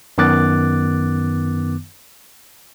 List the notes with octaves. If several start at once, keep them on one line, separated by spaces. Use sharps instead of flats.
F#2 D#3 B3 D6 F#6 A6